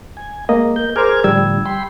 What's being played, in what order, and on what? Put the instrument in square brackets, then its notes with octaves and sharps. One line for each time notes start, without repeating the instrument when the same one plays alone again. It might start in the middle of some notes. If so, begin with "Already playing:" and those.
[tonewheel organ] G#5
[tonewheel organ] G#3 [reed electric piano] A#3 D#5
[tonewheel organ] A#4 G6
[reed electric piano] G#4 A#4 C5 [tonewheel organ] D6 F6 G#6
[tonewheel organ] A2 D3 F3 [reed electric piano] G3 E6 G#6
[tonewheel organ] G5 B5 C6